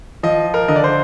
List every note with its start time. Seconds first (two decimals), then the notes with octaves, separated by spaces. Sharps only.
0.23 F3 D#5
0.54 A#4
0.68 D3 D#5
0.76 D5
0.84 C5